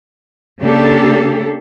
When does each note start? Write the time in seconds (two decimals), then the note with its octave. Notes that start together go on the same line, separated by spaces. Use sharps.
0.61 C#3 A#3 D4 G4 A4